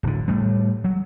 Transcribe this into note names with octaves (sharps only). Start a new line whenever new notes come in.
D1 D3
A2 G3 A3
F#3